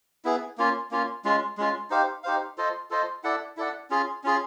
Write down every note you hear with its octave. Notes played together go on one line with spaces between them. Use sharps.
B3 E4 G#4
A#3 C#4 F4
A#3 C#4 F4
G#3 C#4 F4
G#3 C#4 F4
D#4 G4 C5 F5
D#4 G4 C5 F5
F4 A4 C5 D#5
F4 A4 C5 D#5
E4 A4 D5 F#5
E4 A4 D5 F#5
C#4 F4 G#4
C#4 F4 G#4